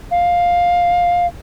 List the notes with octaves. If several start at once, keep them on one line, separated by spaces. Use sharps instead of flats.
F5